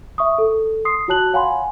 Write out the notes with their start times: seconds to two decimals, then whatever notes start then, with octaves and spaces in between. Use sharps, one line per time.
0.18 E5 C#6 D#6
0.38 A4
0.85 C6 D#6 C7
1.08 F4 F#4 C#5 A5 F#6 F#7
1.33 C#5 F5 F#5 G#5 B5 C6